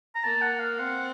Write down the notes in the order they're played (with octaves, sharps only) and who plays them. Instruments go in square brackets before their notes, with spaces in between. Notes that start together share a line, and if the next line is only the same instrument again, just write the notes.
[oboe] A#5
[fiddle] A#3 [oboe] A5
[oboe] F#5
F5
[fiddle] C4 [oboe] F#5